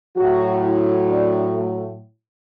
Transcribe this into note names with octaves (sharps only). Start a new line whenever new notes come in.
A2 F#3 F#4
E4
D4
A3